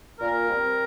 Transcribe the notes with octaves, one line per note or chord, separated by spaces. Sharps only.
A#2 A#4
G3 C4